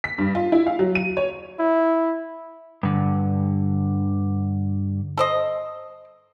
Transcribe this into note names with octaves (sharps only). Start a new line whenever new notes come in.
B6
G2
F4
E4
F5
F#3
D#7
C#5
E4
G2 D3
A4 C5 D#5